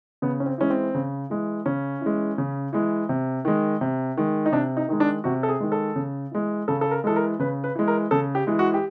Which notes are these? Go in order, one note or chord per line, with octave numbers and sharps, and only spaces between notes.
C#3 B3
C#4
C4
E3 G#3 C#4
C4
C#3
E3 G#3
C#3 C#4
E3 G#3
C#3
E3 G#3
C3
D#3 G#3
C3
D#3 G#3
D#4
C3 D4
D#4
D#3 G#3 D#4
D4
C3 F#4
A4
G#4
D#3 G#3
A4
C#3
E3 G#3
C#3 A4
A4
A#4
E3 G#3 A4
A#4
C#3 B4
B4
E3 G#3
A#4
C#3 A4
G4
E3 G#3
F#4
G4